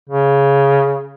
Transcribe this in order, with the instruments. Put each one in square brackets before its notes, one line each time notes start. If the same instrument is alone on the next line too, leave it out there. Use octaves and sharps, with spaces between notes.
[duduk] C#3